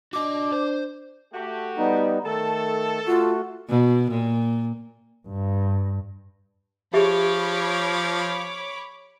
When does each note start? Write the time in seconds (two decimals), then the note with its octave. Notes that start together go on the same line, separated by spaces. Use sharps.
0.13 D4 F#4 D#5 D6
0.52 C5
1.33 A3 F#4 G4
1.78 G3 B3 D#4
2.24 D#3 A3 A4
3.07 A3 F4 F#4
3.70 B2
4.11 A#2
5.28 G2
6.94 F3 G4 G#4 C#5 E5 B5 D6